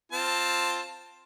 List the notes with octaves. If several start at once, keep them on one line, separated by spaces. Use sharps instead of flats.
C4 F4 A5